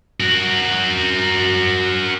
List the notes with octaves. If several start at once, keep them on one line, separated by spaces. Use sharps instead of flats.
F#4 A#4